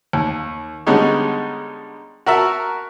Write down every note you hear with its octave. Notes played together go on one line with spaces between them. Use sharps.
D#2
D3 G3 G#3 B3 C#4 D#4
F#4 A#4 E5 A5